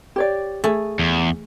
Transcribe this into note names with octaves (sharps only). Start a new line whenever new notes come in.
G4 C#5 D5
A3 G#4 G#5
E2